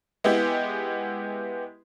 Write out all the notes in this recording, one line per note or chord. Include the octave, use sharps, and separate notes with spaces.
G#3 B3 E4 G4